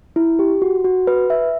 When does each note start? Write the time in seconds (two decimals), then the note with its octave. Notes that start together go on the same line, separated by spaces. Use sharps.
0.16 E4
0.39 G4
0.62 F#4
0.85 F#4
1.07 B4
1.30 E5